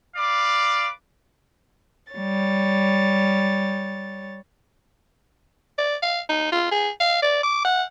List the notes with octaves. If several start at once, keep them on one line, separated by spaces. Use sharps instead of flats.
B4 D5 F5 D6
G3 C#5 A6
D5
F5
D#4
F4
G#4
F5
D5
D6
F#5